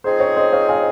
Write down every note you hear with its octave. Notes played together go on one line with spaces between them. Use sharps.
F3 C4 D#4 G#4 C5
C#5
C5 D#5
C#5 F5
F5 G#5